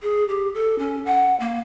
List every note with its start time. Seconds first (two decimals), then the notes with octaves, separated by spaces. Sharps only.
0.02 G#4
0.29 G4
0.54 A4
0.79 C#4
1.06 F#5
1.40 A#3